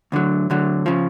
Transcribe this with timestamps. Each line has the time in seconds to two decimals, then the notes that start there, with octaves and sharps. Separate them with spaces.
0.12 D2 D3 F#3
0.50 D2 D3 F#3
0.86 C#3 F3